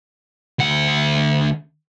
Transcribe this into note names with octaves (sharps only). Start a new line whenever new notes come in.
D2 F#5